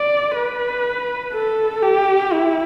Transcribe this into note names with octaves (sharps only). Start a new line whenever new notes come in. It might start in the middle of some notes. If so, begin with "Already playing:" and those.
Already playing: D5
B4
A4
G4
E4